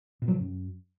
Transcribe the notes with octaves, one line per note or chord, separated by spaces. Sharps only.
B2
F#3
C3
F#2